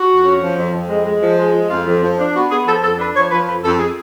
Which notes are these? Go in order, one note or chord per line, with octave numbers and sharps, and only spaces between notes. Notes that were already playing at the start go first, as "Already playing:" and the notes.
Already playing: F#4
F2
C#4
F3
F2
F2
G#3
G#3
F3
G#3
F3
F2 F4
F2
F3
D4
B3 F#4
B3 G#4
F3 A4
F2 A4
D4 B4
F3 C#5
F3 B4
F2 B4
F2 A4
G#4